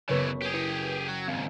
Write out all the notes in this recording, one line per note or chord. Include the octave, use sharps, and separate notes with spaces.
F#1 C#3 E3 B3 B4 C#5 C#6
G4 G#4
E4 B4 A#6 C#7
F#3 G5
D#2 G#2 C4 F5